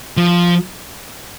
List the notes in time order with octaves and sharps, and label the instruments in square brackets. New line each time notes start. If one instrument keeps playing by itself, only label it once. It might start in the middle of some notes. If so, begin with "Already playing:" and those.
[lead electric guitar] F3